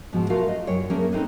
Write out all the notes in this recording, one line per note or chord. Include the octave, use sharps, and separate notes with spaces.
G#2 B2 F3
A3 F4 F#4 A#4 F5
D#5
F#2 C#5 G5
A3 A#3 C#4 G#4 A#4
B3 C4 D#4 G4 A4 B4